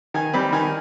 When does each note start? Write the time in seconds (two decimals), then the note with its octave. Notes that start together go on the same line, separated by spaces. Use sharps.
0.14 D#3 G#5
0.34 G3 C4 B5
0.52 D#3 G#5